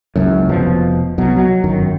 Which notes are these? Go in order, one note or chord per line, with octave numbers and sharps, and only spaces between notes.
F#1 C#2 F#2
F1 B2 F3
C2 B2 F#3
F#3
G1 F#2 D#3